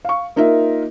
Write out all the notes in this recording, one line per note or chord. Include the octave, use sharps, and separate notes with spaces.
F5 C#6
A#3 D#4 F4 A#4 E5